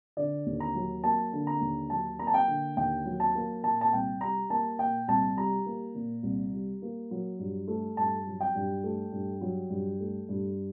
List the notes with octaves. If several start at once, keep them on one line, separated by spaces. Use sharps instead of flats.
D3 D5
D#2
A#5
F#3
A#3 A5
D3
A#5
D#2
F#3 A5
A#3 A#5
A5
G5
D3
D#2 G5
F#3
A5
A#3
A#2 A5
A5
C2 G5
G3 A#5
A#3 A5
A#2 G5
C2 A5
G3 A#5
A#3
A#2
C2
G3
A#3
F#3
G2
A3
G2 A5
F#3
G5
G2
A3
G2
F#3
G2
A3
G2